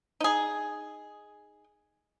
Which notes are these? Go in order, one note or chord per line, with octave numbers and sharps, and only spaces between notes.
D#4 G#4